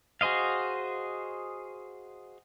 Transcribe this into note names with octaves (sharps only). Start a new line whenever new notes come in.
F#4 G#4 C5 D#5 F5